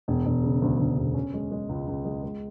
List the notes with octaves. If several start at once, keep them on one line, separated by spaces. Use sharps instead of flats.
E1
E1
C#3
D2
D2
E1
C#4
G#3
G#3
C#2
C#2
G#3
G#3